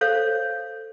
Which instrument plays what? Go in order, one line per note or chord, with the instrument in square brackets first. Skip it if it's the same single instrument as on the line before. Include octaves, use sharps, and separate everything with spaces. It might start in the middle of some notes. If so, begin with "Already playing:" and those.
[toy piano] A4 C5 C#5 F5